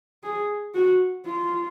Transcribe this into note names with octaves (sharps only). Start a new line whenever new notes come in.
G#4
F#4
F4